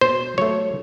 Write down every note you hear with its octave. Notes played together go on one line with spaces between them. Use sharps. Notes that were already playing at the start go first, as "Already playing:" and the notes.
B2 C5
F#3 A3 C#5